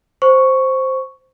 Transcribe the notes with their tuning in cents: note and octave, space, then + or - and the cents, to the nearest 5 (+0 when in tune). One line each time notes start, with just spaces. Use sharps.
C5 +0 C#6 +0